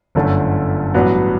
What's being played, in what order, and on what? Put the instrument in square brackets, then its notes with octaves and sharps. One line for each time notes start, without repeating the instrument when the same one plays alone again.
[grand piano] G1 F#2 D3 A3
A1 G2 F#3 B3